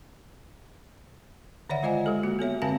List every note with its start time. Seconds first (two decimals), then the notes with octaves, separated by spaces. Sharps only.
1.70 D3 D#3 C#5 D5 E5 F#5
1.83 G#3 F4 C5 D#5 F5 G#5
2.06 G#3 G4 A4
2.23 A#3 F#4
2.39 B3 A4 C#5 E5
2.62 D3 G#3 C4 F5 G#5 A5